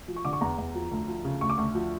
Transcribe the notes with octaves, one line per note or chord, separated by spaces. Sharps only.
F3
C#6
D3 D6
C#6
E2 A#5
E2
F3
D2
F3
C#3
D2 C#6
D6
D2 C#6
F3